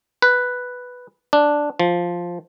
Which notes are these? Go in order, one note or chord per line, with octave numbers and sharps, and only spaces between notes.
B4
D4
F3